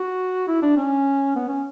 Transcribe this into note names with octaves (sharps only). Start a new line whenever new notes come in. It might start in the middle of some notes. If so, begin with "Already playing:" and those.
Already playing: F#4
E4
D4
C#4
B3
C#4